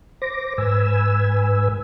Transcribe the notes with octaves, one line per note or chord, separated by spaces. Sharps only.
C5 D6 A#6
G#2 B4 G#5 E6